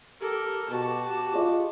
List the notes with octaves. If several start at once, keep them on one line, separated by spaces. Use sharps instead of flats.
G4 A4 A#4
B2 F#4 G4 A5
F4 G#4 D#5